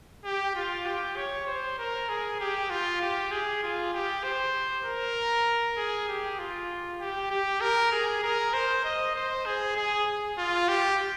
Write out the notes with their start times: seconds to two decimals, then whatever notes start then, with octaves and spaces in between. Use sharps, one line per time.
0.24 G4
0.55 F4
0.86 G4
1.16 C#5
1.47 C5
1.78 A#4
2.09 G#4
2.40 G4
2.70 F4
3.01 G4
3.31 G#4
3.63 F4
3.93 G4
4.24 C5
4.84 A#4
5.77 G#4
6.08 G4
6.39 F4
7.00 G4
7.30 G4
7.61 A#4
7.92 G#4
8.23 A#4
8.53 C5
8.84 D#5
9.15 C5
9.46 G#4
9.76 G#4
10.38 F4
10.68 G4